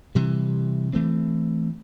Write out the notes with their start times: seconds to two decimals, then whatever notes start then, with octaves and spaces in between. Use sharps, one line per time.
0.15 C3 E3 G3
0.93 E3 A3 C4